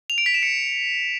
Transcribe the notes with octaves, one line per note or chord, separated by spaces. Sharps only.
F7
D7
B6
E7
C#7